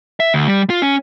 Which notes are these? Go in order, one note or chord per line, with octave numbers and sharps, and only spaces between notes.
E5
D2
G3
F4
C#4